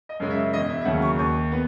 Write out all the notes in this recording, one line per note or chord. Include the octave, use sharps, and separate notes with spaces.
D#5
F#2 C#3 G#3
E5
E1 D#5
E5
E5
D#2 C#3 F#3 F#5
C#6
D#2 C#6
B3